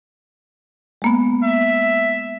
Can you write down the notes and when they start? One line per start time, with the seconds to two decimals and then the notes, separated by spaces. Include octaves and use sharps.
1.02 G#3 A#3 B3
1.44 E5